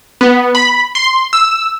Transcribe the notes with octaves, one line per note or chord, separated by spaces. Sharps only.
B3
B5
C6
E6